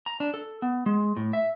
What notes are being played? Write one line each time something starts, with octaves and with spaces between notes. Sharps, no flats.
A#5
D4
A4
B3
G#3
A2
E5